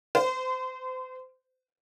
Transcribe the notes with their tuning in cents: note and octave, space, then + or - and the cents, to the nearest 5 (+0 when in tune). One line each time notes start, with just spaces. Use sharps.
C5 -35